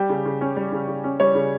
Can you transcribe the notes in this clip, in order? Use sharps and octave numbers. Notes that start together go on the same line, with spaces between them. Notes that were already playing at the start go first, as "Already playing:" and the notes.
Already playing: G3 G4
C#3
C#3
C#4
G3
C#3
C#3
C#4
G3 C#5
C#3